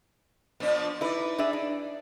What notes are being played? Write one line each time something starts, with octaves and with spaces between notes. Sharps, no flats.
A#2 F3 B3 D4
D#4 E4 B4 D5
D4 G#4 E5
D4